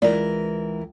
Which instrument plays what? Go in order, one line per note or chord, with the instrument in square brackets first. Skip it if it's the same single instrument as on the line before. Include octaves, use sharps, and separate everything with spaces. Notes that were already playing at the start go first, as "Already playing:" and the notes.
[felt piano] C#2 [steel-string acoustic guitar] E3 E4 A#4 [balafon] D5